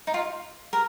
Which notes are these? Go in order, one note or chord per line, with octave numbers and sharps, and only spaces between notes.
D#4
F4
A#4